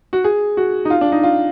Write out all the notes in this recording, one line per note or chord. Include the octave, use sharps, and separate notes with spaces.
F#4
G#4
F#4
D#4
F4
D4
D#4
F4